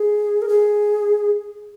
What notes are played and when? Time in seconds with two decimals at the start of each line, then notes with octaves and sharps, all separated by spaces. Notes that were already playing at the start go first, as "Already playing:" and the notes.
Already playing: G#4
0.42 A#4
0.49 G#4